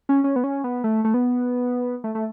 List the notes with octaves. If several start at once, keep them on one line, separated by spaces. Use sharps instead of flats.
C#4
C#4
B3
C#4
B3
A3
A3
B3
A3
A3